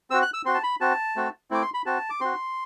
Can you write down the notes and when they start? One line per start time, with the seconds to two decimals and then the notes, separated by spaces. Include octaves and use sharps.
0.10 C4 F#4 E6
0.22 F#6
0.34 E6
0.45 C4 F#4 C6
0.54 A5
0.63 B5
0.81 C4 F#4 A5
1.16 A3 C4 F#4
1.51 A3 C4 E4 D6
1.62 C6
1.74 B5
1.86 C4 F#4 A5
2.10 D6
2.21 C4 F#4 C6